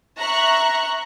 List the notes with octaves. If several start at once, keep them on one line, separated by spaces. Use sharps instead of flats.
E5 A#5 C#6 F#6